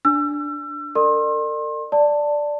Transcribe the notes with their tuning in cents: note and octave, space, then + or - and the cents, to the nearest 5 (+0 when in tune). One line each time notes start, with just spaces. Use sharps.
D4 +0 E6 +35
A#4 -45 D5 +35 C6 +35
D5 +0 A5 +15